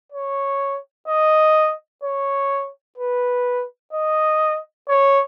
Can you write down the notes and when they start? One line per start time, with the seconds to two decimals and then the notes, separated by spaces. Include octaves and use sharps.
0.12 C#5
1.07 D#5
2.03 C#5
2.98 B4
3.93 D#5
4.88 C#5